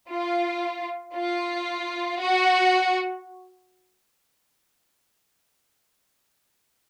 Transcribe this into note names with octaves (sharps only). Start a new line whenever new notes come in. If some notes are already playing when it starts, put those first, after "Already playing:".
F4
F4
F#4